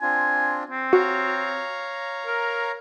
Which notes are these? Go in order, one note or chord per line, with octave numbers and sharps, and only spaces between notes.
C4 D4 F4 G#5
C4
F#4 C#5 F5 A#5
A#4